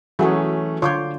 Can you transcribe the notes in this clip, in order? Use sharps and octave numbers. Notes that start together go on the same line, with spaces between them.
E3 F#3 A3 C#4 F#4 G#4
D3 F4 C#5 C6 D6 G6